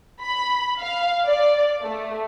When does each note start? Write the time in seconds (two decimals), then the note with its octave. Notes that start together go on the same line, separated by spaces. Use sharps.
0.21 B5
0.80 F5
1.29 D5
1.83 A3